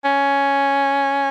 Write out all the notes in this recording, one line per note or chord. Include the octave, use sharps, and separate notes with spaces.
C#4